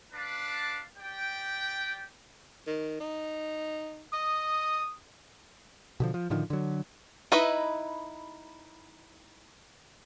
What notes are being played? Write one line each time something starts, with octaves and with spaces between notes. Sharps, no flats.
D4 B4 F5 A5 D6
G4 D5 G5
D#3
D#4
D#5 D#6
B2 D3 F3
F3
A2 D3 D#3 F3
D3 F#3
D#4 E4 B4 D#5 E5